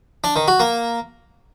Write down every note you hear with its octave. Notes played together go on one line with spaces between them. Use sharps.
D4
D#3
F#4
A#3